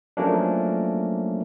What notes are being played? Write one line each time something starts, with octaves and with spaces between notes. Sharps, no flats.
F3 F#3 A3 A#3 C#4 D4